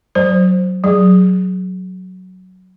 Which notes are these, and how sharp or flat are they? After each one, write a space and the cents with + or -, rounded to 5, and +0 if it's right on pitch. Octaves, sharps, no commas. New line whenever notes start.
F#3 +0 C5 +0
F#3 +0 G#4 -5